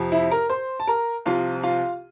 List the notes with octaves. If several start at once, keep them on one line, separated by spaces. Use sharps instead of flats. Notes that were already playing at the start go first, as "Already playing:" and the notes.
Already playing: F2 C3 F3
E4 E5
A#4 A#5
C5 C6
A5
A#4 A#5
C2 C3 F3 F4 F5
F4 F5